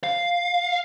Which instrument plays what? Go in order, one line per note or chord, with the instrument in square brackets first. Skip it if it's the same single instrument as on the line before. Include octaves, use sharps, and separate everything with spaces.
[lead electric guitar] F5